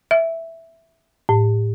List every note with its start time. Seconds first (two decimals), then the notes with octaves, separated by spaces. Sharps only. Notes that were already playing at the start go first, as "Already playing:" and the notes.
0.11 E5
1.29 A2